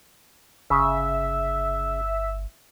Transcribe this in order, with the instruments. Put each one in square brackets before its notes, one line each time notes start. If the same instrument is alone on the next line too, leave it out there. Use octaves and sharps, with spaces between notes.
[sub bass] G1 [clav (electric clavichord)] C#3 [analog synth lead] E5